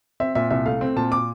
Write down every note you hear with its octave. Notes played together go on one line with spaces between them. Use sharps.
C4 E5
A#2 E5
C2 E5
A3 F5
C4
A#2 A5
D6